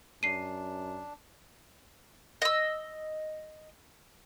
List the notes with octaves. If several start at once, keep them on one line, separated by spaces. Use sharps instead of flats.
F#2 D4 C7 D#7
D#5 E6